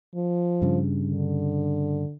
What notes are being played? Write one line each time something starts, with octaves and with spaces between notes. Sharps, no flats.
F3
G2 C#3
D3